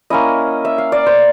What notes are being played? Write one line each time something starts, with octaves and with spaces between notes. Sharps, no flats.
A#3 C#4 E4 D#5
E5
F5
D5
C5